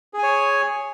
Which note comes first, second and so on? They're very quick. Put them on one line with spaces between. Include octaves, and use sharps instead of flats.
G#4 G#5 C#5